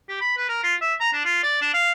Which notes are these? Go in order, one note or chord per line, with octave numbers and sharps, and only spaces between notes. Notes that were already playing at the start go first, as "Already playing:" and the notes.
G4
B5
B4
A#4
F4
E5
A#5
D4
F4
D5
D4
F5